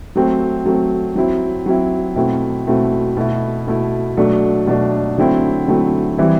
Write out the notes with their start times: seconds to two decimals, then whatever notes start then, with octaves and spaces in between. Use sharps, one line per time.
0.16 F#3 A3 C4
0.66 F#3 A3 C4
1.16 F#3 C4 E4
1.66 F#3 C4 E4
2.16 B2 A3 C4 E4
2.67 B2 A3 C4 E4
3.17 B2 A3 E4
3.67 B2 A3 E4
4.17 B2 F#3 A3 D4
4.67 B2 F#3 A3 D4
5.18 D3 F#3 A3 C4 E4
5.67 D3 F#3 A3 C4 E4
6.18 E3 G3 C4 E4